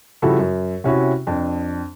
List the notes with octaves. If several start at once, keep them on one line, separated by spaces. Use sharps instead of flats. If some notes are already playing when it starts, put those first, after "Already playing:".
C#3 F3 G3 E4 F#4 A4
F#2
C3 C#4 E4 F#4
F2 D4